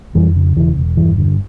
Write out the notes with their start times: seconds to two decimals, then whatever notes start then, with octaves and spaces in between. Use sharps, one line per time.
0.15 F2 E3 G3
0.36 C#3
0.56 E1 E3
0.77 E1
0.97 G2 E3
1.18 D3